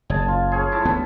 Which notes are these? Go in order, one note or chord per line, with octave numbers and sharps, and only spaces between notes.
F#1 G#4 G#5 A5
F4
G#4 C#5 F5
A3 E4 A5
D2 B3